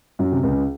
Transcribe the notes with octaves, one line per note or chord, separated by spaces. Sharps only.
F#2 F#3
C3
C#2 C#3